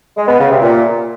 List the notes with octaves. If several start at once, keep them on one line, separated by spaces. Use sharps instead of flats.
G#3
B3
C#3
C3
A#2